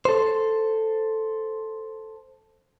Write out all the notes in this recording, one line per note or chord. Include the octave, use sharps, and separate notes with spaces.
A4 C5